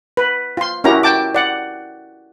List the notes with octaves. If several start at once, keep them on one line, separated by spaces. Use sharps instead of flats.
B4
F4 C6
C#4 E4 F#4 G4 A#4 A#5
G5 A5 D6
D5 F#5